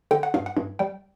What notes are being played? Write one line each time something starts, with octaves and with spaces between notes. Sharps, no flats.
D3 G5
F#5
G2 F5
F#5
G2
G3 G5